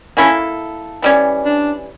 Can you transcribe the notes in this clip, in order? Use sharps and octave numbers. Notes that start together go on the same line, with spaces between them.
A#3 C#4 E4 A4
E3 G3 C#4
D4